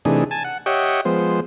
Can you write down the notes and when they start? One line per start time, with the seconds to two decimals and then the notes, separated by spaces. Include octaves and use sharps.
0.05 C3 E3 A3 D4 D#4 G#4
0.31 G#5 A5
0.44 F#5
0.66 G4 C#5 D#5 E5 F#5 G5
1.05 F3 G#3 B3 C5